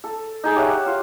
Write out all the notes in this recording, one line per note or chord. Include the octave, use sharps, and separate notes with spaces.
A4
D#4 G#4
G4 C#5 E5 F#5
F4 F5